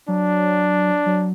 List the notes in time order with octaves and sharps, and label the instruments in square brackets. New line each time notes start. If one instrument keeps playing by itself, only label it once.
[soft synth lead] F#3 [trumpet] D4
[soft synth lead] F#3